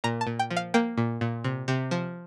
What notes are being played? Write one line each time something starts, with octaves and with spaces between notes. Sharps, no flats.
A#2 A#5
A5
A#2
G5
F3
F5
A#3 G5
A#2
A#2
C3
C3
F3